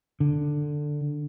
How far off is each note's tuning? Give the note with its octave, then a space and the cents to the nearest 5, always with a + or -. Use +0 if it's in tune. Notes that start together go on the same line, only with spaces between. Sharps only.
D3 +5